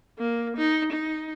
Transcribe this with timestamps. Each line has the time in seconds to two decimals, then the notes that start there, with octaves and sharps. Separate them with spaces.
0.19 A#3
0.57 D#4
0.92 D#4